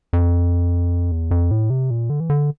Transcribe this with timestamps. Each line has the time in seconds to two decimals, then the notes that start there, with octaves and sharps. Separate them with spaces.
0.13 F2
1.12 E2
1.31 F2
1.51 A2
1.70 C3
1.91 A#2
2.10 D3
2.20 E3
2.30 D3